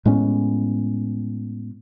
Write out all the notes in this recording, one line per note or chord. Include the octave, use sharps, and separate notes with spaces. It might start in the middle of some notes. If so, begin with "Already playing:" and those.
A2 G#3 B3 C#4